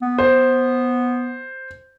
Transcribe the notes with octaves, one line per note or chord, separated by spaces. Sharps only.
B3
C5